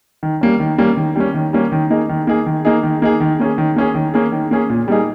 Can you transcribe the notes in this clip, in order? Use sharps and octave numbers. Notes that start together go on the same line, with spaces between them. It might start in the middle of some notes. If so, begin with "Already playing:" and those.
D#3
G3 A#3 C#4
D#3
G3 A#3 C#4
D#3
G3 A#3 C#4
D#3
G3 A#3 C#4
D#3
A#3 D#4 G#4
D#3
A#3 D#4 G#4
D#3
A#3 D#4 G#4
D#3
A#3 D#4 G#4
D#3
A#3 C#4 G#4
D#3
A#3 C#4 G#4
D#3
A#3 C#4 G#4
D#3
A#3 C#4 G#4
A#2
G3 A#3 D#4 G#4